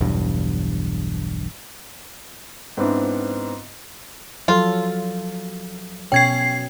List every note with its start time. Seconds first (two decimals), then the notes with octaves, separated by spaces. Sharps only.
0.01 E1 B1 E2 G2
2.77 G#2 B3 C4 D4 E4
4.48 F3 F#3 F4 A4
6.12 B2 C#4 C#5 G5 G#6 C7